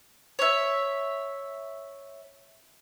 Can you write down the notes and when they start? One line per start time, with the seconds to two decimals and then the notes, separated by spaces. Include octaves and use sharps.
0.39 C#5 E5